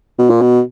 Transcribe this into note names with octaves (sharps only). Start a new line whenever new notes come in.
B2
A#2
B2